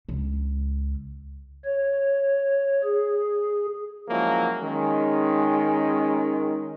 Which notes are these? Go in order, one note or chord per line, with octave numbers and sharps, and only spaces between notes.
C#2
C#5
G#4
F3 F#3 G#3 A#3 C#4 E4
D#3 G#3 C#4